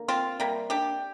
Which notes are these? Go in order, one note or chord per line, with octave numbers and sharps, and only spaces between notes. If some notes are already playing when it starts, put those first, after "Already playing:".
Already playing: D3 A#3
C4 F4
C3 G3 A#3
D4 G4